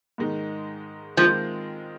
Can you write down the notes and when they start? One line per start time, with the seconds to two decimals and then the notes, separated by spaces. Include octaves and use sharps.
0.18 G#2 D#3 G#3 D#4
1.17 D#3 F3 G#3 C4 F4